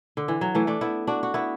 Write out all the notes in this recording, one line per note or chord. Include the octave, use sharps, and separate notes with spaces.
D3
E3
F#3
E3 A3
A3 D4
B3 E4
D4 F#4
F#4
B3 E4